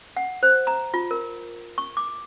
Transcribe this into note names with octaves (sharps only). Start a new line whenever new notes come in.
F#5
C5
A#5
F4
A#4
C#6
D6